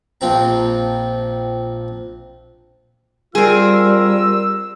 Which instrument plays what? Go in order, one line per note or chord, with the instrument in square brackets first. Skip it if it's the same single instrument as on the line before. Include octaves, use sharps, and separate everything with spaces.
[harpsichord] A#1 F3 C4 A#5
[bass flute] G3 [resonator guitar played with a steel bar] C4 G#4 [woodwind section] F4 A#4 [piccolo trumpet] E6